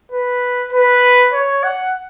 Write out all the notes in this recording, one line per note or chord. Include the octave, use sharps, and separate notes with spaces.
B4
B4
C#5
F#5